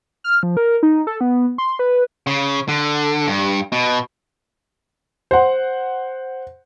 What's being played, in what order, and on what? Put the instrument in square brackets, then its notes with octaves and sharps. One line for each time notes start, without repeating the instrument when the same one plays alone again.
[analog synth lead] F6
F3
A#4
D#4
A4
B3
C6
B4
[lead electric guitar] C#3
D3
G2
B2
[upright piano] C5 F#5